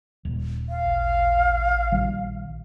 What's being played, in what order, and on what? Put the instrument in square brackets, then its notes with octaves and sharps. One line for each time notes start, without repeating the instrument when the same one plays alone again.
[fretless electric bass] D#1
[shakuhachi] F5
[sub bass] A1
[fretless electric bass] A#1 D#3 G3